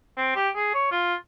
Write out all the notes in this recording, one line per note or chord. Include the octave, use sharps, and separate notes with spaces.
C4
G4
G#4
C#5
F4